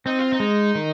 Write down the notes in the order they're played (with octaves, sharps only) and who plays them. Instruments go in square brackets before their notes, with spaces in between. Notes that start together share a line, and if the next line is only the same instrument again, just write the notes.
[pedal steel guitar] C4 [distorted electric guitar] D#4
[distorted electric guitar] F4
D#4
[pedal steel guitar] G#3
D#3